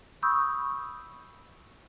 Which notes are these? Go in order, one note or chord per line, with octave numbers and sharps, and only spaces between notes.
B5 C#6 D#6 E6 G6